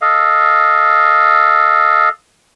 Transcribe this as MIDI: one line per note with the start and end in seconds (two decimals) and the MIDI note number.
0.01 2.09 69
0.01 2.09 75
0.01 2.09 77